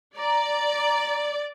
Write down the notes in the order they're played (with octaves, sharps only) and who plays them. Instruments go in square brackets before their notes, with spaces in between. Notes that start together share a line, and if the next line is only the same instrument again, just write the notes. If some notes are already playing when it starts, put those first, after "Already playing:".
[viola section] D5 [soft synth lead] A#5